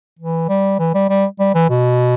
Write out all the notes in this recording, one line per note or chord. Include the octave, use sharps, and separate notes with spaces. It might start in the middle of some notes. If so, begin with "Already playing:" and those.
E3
G3
E3
G3
G3
G3
E3
B2